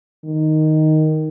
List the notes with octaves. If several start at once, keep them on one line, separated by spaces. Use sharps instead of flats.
D#3